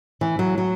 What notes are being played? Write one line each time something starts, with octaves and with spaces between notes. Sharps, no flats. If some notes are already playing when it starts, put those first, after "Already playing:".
E3
F#3
F#3